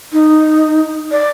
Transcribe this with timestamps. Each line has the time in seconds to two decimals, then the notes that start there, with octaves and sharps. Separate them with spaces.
0.12 D#4
1.11 D5